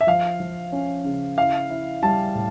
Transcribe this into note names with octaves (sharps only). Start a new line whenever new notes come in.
E5
F3 F5
F3
C#4
C#3
E4 F5
E4
G3 A5
A2